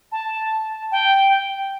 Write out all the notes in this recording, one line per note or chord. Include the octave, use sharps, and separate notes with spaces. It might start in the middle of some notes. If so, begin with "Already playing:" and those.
A5
G5